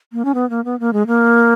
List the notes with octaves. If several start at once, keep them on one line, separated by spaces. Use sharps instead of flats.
A#3
C#4
B3
A#3
B3
A#3
G#3
A#3